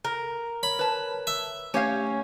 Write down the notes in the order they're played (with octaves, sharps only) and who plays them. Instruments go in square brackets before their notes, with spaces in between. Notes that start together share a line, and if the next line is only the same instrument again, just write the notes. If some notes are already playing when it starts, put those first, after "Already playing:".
[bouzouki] A#4
[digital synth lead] C#5 [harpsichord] B5
[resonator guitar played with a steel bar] B4 A5 [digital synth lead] C#5
[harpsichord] E5
[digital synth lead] A3 [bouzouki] C#4 [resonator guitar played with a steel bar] G4 C#5 F5